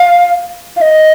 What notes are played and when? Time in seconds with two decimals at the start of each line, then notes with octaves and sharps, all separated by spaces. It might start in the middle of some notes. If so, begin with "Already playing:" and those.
Already playing: F5
0.76 F5
0.81 D#5